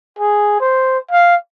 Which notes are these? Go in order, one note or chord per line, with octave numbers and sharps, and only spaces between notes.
G#4
C5
F5